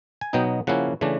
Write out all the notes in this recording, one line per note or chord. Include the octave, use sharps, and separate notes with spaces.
G#5
B2 F#3 B3 D#4 G5
C#3 F3 A#3 C#4 E4 F#5
C#3 E3 A3 D4